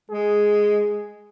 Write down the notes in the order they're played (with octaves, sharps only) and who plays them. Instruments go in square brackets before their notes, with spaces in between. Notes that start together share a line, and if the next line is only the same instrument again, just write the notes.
[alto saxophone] G#3 [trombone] G#4